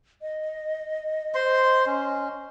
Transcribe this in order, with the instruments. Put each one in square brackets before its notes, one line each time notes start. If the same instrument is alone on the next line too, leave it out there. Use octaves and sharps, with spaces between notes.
[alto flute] D#5
[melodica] C5 C6
C#4